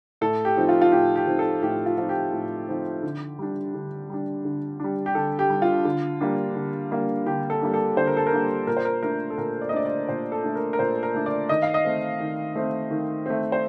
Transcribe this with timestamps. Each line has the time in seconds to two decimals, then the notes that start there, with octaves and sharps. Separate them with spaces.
0.21 A2 A4
0.45 G4
0.57 F3 C4 D#4
0.69 F4
0.82 F4
0.92 A2 G4
1.16 G4
1.27 F3 C4 D#4
1.39 A4
1.62 A2 G4
1.86 F4
1.98 F3 C4 D#4 F4
2.09 G4
2.32 A2
2.68 F3 C4 D#4
3.03 D3
3.39 G3 D4
3.74 D3
4.10 G3 D4
4.45 D3
4.80 G3 D4
5.06 G4
5.15 D3 A4
5.39 G4
5.50 G3 D4
5.62 F4
5.85 D3
6.21 G3 A#3 D4
6.56 D3
6.91 G3 A#3 D4
7.26 D3 G4
7.50 A4
7.62 G3 A#3 D4
7.74 A4
7.97 D3 C5
8.07 A#4
8.17 A4
8.27 A#4
8.32 G3 A#3 D4
8.67 A#2 A#4
8.77 C5
8.85 A#4
9.03 A3 D4 A#4
9.30 A4
9.38 A#2 A#4
9.62 D5
9.69 D#5
9.73 A3 D4 D5
9.85 D5
10.09 A#2 C5
10.32 A4
10.44 A3 D4
10.56 A#4
10.73 A#4
10.79 A#2 C5
11.03 A#4
11.15 A3 D4
11.26 D5
11.49 D#3 D#5
11.62 F5
11.74 D#5
11.85 A3 C4
12.20 D#3
12.55 A3 C4
12.91 D#3
13.26 A3 C4
13.52 C5